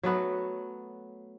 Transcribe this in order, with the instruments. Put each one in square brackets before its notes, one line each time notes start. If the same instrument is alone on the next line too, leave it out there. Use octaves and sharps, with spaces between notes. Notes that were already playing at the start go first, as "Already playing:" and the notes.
[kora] F#3 A3 B3 F#4